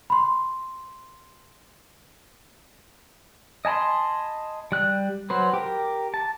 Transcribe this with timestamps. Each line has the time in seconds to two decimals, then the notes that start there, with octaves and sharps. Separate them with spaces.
0.10 B5 C6
3.65 D#5 G#5 A5 B5 C6
4.72 G3 F#6
5.30 F#3 B4 C5
5.54 G4 A#4
6.14 A5